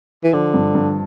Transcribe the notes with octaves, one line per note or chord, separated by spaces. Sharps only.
E3
D3 F3
G2
G2